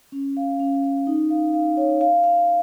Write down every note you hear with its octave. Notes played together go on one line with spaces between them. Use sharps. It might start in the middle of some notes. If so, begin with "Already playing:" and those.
C#4
F5
C#4
C#4
D#4
F5
F5
C#5
F5
F5